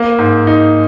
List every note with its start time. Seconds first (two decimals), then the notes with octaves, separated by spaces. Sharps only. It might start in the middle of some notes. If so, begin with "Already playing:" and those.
Already playing: A#3
0.19 G#2
0.47 D#4